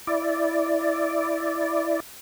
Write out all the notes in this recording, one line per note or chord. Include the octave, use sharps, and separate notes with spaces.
E4 D5